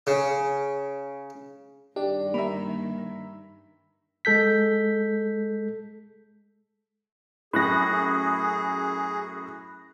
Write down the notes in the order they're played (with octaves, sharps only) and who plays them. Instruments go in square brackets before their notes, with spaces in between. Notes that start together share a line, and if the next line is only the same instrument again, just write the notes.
[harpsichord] C#3
[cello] G2 D#3 [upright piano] D4 [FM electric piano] G4
[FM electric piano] A#3 [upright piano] E5 A#5 B5
[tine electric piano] G#3 A4 G6 B6
[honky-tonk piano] F#2 A2 [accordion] G#4 [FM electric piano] B5 F#6 A#6